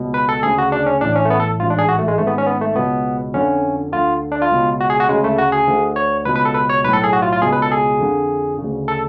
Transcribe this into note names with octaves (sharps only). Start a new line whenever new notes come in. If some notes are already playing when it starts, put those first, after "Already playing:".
Already playing: C#2 B2
B4
A4
D2 C#3 G#4
F#4
D4
C#4
A1 A2 D4
C#4
A3
B3
A4
A1 G#2 F4
D4
G#4
F#4
A3
G#3
G#1 G#2 A3
B3
C#4
B3
A3
C#2 B2 B3
F2 D3 C#4
D2 D3 F4
D4
F4
C#2 B2
F#4
G#4
F#4
D2 C#3 G#3
A3
F#4
G#4
D2 D3
C#5
C#2 B2 B4
B4
A4
B4
C#5
B1 A2 A4 B4
G#4
F#4
F4
F4
C#2 B2 G#4
B4
A4
G#4
F2 D3
C#3
D2
A4